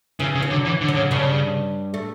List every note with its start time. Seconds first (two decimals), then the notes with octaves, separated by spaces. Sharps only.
0.20 C#3 E3
0.35 C#3
0.43 F#3
0.51 D3
0.65 E3
0.81 D3
0.88 F#3
0.96 C#3
1.11 G2 C#3 G3
1.94 A3